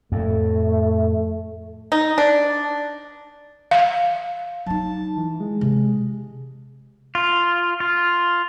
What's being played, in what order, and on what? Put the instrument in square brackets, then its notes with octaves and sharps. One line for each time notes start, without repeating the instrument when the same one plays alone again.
[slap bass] F2 A2 [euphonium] A3
[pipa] D#4
D4
[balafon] F5
[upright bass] F#3 D#4 [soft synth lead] A5
[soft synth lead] E3
G#3
[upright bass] C3
[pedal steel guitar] F4
F4